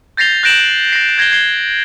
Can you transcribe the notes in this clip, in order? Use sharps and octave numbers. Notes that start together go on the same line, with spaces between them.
G6 A6 A#6 C7 F7 G7
F#6 G6 A#6 D7 E7 F#7
A#6 C7
G6 G#6 A#6 C7 G7
G#6 C7 G7